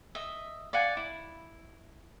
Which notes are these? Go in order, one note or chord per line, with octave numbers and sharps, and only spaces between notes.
D#5 E5
D5 F5 F#5 G#5
E4